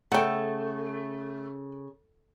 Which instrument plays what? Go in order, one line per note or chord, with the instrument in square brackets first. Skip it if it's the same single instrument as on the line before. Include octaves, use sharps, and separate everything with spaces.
[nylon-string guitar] C#3 A4 [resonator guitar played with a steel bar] A3 [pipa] F#5 G5